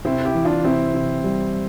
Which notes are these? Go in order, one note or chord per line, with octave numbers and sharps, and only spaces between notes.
C3 C4 E4
E4 G4
E3
D4 F4
C3 C4 E4
C3
G3